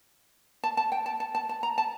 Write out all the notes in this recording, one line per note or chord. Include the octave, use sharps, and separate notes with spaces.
A5
A5
G5
A5
A5
A5
A5
A#5
A5